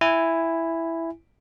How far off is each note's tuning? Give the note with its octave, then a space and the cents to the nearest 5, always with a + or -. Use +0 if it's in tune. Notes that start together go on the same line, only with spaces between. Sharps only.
E4 +5 G#5 -20